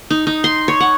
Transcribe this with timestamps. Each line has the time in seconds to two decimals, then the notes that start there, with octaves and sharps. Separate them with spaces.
0.11 D#4
0.27 D#4
0.44 C6
0.68 C#5
0.80 F#5